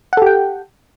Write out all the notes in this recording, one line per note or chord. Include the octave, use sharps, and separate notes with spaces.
G4 A4 F#5 G5